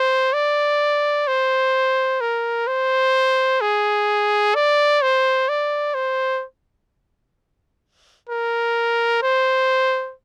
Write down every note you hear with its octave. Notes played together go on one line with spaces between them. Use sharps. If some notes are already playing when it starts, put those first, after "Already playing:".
Already playing: C5
D5
C5
A#4
C5
G#4
D5
C5
D5
C5
A#4
C5